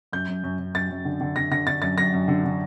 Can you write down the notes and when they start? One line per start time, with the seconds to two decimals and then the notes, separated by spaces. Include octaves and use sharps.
0.13 F#2 G6
0.28 F#2
0.44 F#2
0.59 F#2
0.74 F#2 A6
0.91 F#2
1.05 D3
1.21 D3
1.36 D3 A#6
1.51 D3 A#6
1.67 D3 A6
1.82 F#2 A6
1.98 F#2 A#6
2.14 F#2
2.28 D3
2.44 D3